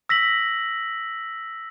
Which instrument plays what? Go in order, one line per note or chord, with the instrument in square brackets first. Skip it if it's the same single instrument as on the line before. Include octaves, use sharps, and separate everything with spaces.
[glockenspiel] E6 A#6 B6 F#7